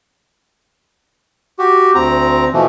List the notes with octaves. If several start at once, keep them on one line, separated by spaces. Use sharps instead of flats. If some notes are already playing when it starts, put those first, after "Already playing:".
F#4 G4
D2 C4 A#5
B2 E3 F3 A3